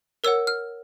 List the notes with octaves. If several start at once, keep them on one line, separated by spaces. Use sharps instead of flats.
A#4 C#5 F#5 E6
F6